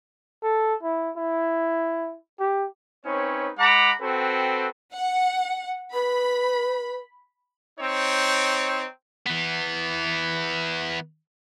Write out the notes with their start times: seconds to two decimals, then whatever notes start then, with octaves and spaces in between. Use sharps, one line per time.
0.43 A4
0.83 E4
1.17 E4
2.39 G4
3.05 C4 C#4 D#4 B4 C#5
3.58 G#3 F#5 A#5 B5 D6
4.01 C4 F#4 A4 B4 G5
4.94 F#5
5.94 B4 B5
7.78 C4 D#4 C#5
9.26 E3 B3